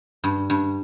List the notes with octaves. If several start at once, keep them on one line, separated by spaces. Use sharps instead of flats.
G2
G2